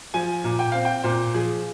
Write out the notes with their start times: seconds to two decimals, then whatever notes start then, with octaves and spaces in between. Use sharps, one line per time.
0.14 F3 G#5
0.44 A#2
0.59 G5
0.72 C4 F5
0.85 G5
1.03 A#2 C5
1.34 F3 G#4